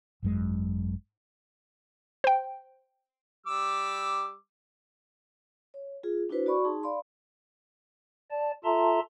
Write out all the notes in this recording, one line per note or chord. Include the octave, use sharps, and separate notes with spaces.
G#1 F#2 G#3
C5 G5
G3 D6 E6
C#5
F4 G#4
D4 E4 F#4 B4 C5
F#4 D5 B5 C#6
D#4 G#4 A5 C6
D5 F5 B5 C6
D5 A5
F4 A4 E5 A5 A#5 C6